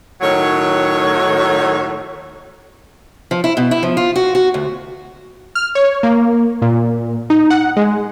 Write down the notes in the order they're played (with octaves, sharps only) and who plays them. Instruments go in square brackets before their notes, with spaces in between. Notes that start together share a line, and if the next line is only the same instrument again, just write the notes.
[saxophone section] A2 D#3 F#3 C#5
[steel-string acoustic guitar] F3
E4
B2
E4
F3
F4
F#4
F#4
D2
[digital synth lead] F6
C#5
A#3
A#2
D#4
F#5
G#3